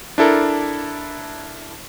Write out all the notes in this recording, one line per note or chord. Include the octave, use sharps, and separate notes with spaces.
D4 E4 A4 A#4